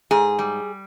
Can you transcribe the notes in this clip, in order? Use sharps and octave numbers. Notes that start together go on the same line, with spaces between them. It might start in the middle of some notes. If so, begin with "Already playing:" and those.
G#2 G#4
G3